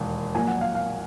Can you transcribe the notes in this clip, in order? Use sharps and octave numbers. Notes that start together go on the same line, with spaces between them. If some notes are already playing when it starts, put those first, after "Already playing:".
Already playing: E1 D#2 D#3
A#1 A#2 F#3 G#5
F#5
F5
F5